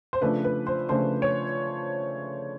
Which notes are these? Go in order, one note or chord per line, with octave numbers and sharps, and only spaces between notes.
C5
C#3 F3 A3 D4 B4
B4
C5
C#3 F3 A3 D4 C5
C#5